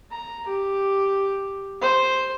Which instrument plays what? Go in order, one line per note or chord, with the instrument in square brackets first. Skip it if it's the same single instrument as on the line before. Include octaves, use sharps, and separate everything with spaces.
[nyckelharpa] A#5
G4
C5